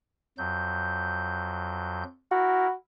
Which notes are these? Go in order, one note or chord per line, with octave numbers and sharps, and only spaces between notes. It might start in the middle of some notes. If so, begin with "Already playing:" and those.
F2 F#3 G6
E4 F#4 A#4